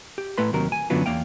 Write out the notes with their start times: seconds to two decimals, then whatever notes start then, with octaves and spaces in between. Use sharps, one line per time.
0.18 G4
0.38 A2 A3 B4 C6
0.53 D#2 C3 F#3 A#4
0.72 G#5
0.90 F#2 D3 F#3 B3 C#4 F4
1.06 E2 A#3 F5 G5